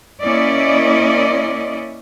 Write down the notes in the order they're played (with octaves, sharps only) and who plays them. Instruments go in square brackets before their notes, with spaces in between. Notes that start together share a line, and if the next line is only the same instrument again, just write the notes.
[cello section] A#3 C#4 E4 D5 D#5